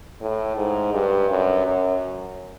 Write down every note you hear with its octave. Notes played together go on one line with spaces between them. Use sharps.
A2
G#2
G2
F#2
F#2